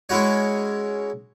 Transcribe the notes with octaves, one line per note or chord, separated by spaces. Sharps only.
G#3 C#4 E4 F#4 C#5